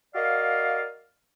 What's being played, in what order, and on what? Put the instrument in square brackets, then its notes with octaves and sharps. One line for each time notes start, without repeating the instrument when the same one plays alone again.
[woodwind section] F#4 A#4 D5 D#5 F5